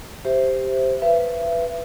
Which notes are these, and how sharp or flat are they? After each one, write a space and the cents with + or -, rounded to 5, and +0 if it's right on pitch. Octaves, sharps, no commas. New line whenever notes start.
G4 +0 C5 +0 E5 +0
B4 +0 E5 +35